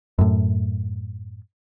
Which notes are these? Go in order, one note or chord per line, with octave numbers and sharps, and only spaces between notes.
F#2 A2